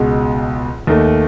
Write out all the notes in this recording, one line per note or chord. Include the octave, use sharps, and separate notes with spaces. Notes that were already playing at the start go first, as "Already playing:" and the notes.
Already playing: C#2 B2 G#3
D#2 D#3 A3